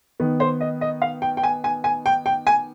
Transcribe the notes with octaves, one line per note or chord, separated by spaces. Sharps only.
D#3 B3
C5
D#5
D#5
F5
G5
G5
G#5
G#5
G#5
G5
G5
G#5